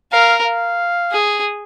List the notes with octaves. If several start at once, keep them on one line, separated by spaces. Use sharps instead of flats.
A#4 F5
F5
G#4